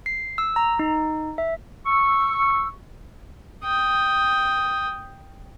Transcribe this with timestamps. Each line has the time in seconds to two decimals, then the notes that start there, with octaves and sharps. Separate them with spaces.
0.06 C7
0.38 E6
0.56 A#5
0.79 D#4
1.38 E5
1.85 C#6 E6
3.64 G5 D#6